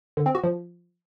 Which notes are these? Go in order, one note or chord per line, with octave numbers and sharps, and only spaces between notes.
D3
C4
F#4
F3